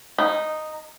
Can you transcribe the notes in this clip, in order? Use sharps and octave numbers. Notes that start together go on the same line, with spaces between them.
D#4